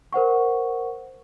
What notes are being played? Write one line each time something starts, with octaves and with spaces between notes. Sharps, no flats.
A#4 C5 F#5 C#6